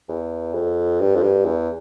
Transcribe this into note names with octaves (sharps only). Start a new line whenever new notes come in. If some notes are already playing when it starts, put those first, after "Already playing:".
E2
F2
G2
F2
G2
E2